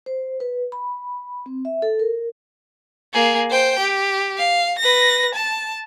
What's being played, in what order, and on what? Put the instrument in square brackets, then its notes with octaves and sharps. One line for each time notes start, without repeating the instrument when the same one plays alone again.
[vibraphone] C5
B4
B5
C4
E5
A4
A#4
[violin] A#3 G#4
C5 G5
G4
F5
B4 A#6
A5